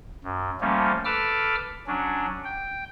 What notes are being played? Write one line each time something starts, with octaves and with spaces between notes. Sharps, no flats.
F#2
F3 G3 A3 A#3 C#4
A4 B4 D6 E6 F6
F#3 C#4 D4
G5